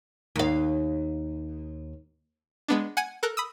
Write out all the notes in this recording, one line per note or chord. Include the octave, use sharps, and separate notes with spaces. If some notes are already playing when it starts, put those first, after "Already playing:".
D#2 F5
G#3 B3 D4
F#5 G#5 G#6 D#7
A4 A#4 F#6
B5 D#6 E6